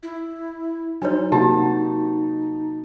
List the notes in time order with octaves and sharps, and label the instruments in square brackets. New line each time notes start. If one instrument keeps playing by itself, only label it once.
[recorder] E4
[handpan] F#3 C5 [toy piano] D4 C#5 [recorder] D#4
[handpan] C3 A#3 F#4 [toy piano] G4 [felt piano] A5